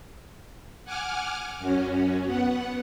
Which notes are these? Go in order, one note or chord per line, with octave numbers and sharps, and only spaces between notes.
F#5 G#5 D6 F6
F#2 F#3 C#4
B3 F#5